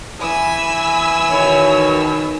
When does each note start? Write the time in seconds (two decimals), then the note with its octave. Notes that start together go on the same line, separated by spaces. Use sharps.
0.21 E3 G#5 B5 E6
1.31 B2 D#3 C#5